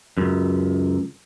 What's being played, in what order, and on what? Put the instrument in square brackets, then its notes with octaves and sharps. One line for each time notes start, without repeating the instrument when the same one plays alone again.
[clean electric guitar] C#2 F#2